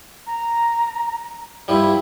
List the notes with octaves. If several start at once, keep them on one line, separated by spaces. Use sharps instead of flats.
A#5
G2 F3 G3 E4